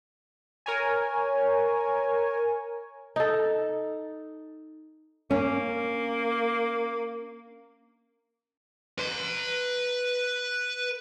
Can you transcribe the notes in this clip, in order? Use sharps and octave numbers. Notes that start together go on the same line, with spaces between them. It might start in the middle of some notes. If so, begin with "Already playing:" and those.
A#4 C#5 G#5
D#4 A4
A#3 C#4
B4 C6